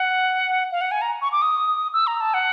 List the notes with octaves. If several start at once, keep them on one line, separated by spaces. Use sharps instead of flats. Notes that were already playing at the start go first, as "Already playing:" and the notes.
Already playing: F#5
F5
F#5
G#5
A#5
C#6
D6
D#6
E6
A#5
A5
F#5